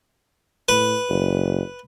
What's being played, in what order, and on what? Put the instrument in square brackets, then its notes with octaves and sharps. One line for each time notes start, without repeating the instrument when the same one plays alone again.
[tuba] A2 [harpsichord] B4
[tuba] F#1